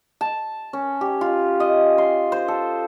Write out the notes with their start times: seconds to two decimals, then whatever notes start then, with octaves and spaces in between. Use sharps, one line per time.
0.21 A5
0.73 C#4
1.01 G4
1.21 F4
1.60 D#5
1.98 C6
2.32 C5
2.48 A4